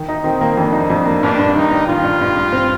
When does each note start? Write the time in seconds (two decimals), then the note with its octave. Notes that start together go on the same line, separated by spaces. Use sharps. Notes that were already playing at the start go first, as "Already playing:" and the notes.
Already playing: D#3
0.08 D#4
0.24 D#3 C4
0.41 A#3
0.57 F2 D4
0.73 D#4
0.90 F2
1.05 A#3
1.22 G2 D4
1.39 G2
1.55 D#3 D#4
1.71 G2
1.88 G2 F4
2.03 G2
2.21 G2
2.36 G2
2.53 C4